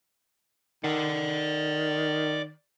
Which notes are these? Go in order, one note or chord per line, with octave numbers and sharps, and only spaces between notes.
D#3 D5 F#5